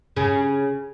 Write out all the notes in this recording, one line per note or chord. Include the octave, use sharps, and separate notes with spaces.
C#3